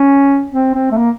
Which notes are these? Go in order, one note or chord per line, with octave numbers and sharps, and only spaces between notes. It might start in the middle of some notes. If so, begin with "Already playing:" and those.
Already playing: C#4
C4
C4
A3
A#3